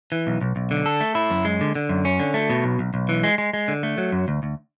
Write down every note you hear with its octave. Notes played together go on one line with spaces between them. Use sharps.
E3
B1
B1
B1
D3
A4
A3
E4
F#2
G#3
D3
D3
F#2
C#4
D3
A3
B2
B1
B1
B1
E3
G#3
G#3
G#3
D3
A3
F#3
F#2
D2
D2